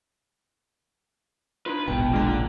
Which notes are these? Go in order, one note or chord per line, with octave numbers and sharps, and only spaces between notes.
D4 D#4 F4 B4 C6
E1 A#1 G#2 B2 G5
D3 G#3 A#3 D4 F4 A#5